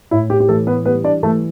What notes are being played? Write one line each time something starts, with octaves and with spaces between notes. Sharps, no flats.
A2 E4
G4
G4
E3 A3 A4
B3 B4
G3 B3 B4
D4 D5
E3 A3 A4